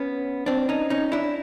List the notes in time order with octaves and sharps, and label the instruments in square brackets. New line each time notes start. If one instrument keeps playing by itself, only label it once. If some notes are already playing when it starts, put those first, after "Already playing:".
Already playing: [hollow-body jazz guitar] B3 C#4
C4 D4
C#4 D#4
C#4 D#4
D4 E4